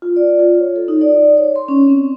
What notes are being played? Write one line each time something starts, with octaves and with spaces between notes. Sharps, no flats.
F4
D5
F4
C#5
A4
D#4
D5
C#5
C6
C#4
C4